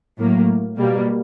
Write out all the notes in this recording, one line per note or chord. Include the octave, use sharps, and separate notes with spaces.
A2 F#3 A#3
B2 G3 A#3